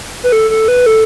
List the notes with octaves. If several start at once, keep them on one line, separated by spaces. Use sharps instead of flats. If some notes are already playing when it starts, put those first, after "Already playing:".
B4
A4
A4
B4
A4